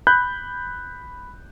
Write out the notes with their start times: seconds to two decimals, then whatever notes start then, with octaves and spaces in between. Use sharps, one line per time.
0.07 B5 F#6 G6